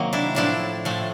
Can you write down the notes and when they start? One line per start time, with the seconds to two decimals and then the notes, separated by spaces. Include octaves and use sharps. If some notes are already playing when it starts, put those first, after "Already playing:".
Already playing: C3 D#3 F#3 A#3
0.13 D4 E4
0.35 A2 F3 A3 D4 E4
0.85 A2 F3 A3